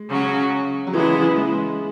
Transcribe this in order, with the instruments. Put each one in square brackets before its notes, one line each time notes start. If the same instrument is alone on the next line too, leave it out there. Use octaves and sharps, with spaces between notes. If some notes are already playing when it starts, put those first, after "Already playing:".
Already playing: [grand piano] G#3
[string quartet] C#3 F#3 C#4 F#4
[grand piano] F#3
[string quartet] C#3 G#3 B3 E4 [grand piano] E3
[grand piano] G#3